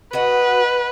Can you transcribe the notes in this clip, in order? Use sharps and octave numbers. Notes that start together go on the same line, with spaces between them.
F#4 B4 D#5 F#5